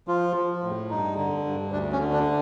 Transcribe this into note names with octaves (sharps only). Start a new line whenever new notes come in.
F3 F4
F3
A2
G2 D#4
D3
G2
D2 D4
C#4
D3
D4